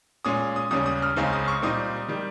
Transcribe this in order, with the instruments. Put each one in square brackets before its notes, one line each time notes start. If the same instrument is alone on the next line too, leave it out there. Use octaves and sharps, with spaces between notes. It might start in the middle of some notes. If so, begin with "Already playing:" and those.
[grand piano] A#2 G#3 C#4 D#6
D#6
D#2 C#3 G3 C#4 D#6
D#6
F6
C#2 C#3 G#3 C4 D#4 F6
D#6
C#6
A#2 G3 C4 D#4 D#6
D#3 G3